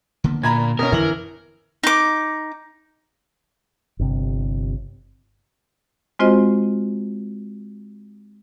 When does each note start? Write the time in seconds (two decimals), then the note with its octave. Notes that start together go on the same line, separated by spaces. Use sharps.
0.24 D3 A#3 B3
0.43 A#2 A#5 B5 G#6
0.79 B2 C#4 A#4
0.92 F2 D3 E3 F#7
1.83 D#4 D6
3.99 G1 C3
6.19 G#3 C4 F4 F#4 C5 D#5